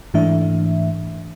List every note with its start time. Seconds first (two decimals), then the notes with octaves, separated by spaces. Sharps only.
0.14 G#2 E3 A3 D4 E5